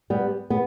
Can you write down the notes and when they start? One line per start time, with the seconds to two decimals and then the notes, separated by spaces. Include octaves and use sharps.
0.10 G3 B3
0.50 B3